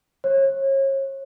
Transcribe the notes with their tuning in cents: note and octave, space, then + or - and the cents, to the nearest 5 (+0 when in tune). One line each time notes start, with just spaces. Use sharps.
C#5 -35